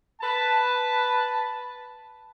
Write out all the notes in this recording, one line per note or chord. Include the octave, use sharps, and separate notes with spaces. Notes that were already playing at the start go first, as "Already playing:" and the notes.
B4 A5